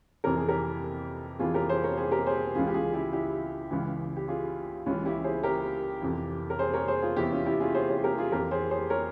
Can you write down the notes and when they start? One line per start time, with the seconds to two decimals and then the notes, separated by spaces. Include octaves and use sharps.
0.24 F2 C3 E3 A#4
0.37 G#4
0.48 G4 A#4
1.39 F2 C3 E3 F4 G#4
1.54 G4 A#4
1.69 G#4 C5
1.83 A#4 C#5
1.97 G#4 C5
2.11 G4 A#4
2.26 G#4 C5
2.55 C#2 C#3 E3 F4 G#4
2.67 G4
2.74 F4 G#4
2.93 E4 G4
3.13 E4 G4
3.71 C#2 C#3 E3
4.16 G4
4.28 F4 G#4
4.86 C#2 C#3 E3 C#4 F4
5.05 E4 G4
5.24 G#4 C5
5.43 G4 A#4
6.02 F2 C3 E3
6.50 A#4
6.59 G#4 C5
6.73 A#4 C#5
6.88 G#4 C5
7.02 F4 G#4
7.17 E2 C3 E3 E4 G4
7.32 C#4 F4
7.46 E4 G4
7.60 F4 G#4
7.75 G#4 C5
7.90 G#4 C5
8.04 G4 A#4
8.18 F4 G#4
8.32 F2 E3 G4 A#4
8.51 G#4 C5
8.71 G#4 C5
8.90 A#4 C#5